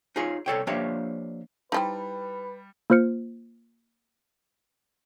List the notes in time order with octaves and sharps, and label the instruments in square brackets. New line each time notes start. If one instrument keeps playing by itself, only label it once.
[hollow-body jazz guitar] D#4 F4 G#4 C#5
C2 A4 C#5 G5
F3 A#3 D4 G4 C#5 E5
[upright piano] G3 [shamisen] D#4 E4 C5 [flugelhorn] B4 [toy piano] G5 A5
[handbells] A#3 F4 C5 F6 C#7